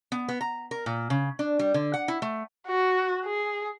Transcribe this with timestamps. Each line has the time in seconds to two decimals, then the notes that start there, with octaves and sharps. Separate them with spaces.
0.12 B3
0.28 B3
0.41 A#5
0.71 A#4
0.86 A#2
1.10 C#3
1.39 D4
1.59 G3
1.74 D3
1.94 F#5
2.08 E4
2.22 A3
2.67 F#4
3.25 G#4